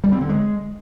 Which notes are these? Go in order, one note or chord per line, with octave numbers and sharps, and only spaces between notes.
G3
C4
D3
G#3